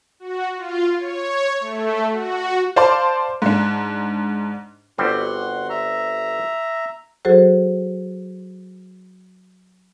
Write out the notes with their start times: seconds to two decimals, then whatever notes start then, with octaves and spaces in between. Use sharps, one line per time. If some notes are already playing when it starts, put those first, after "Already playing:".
0.20 F#4
0.57 F4
0.98 C#5
1.60 A3
2.11 F#4
2.76 C5 D5 F5 A5 C6 D6
3.42 G#2 D4
4.98 G1 G3 C4 F#4 F#5 C6
5.70 E5 A#5
7.25 F#3 F#4 G#4 A4 C5